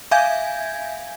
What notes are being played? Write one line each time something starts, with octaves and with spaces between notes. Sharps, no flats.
E5 F5 G#5 G6 G#6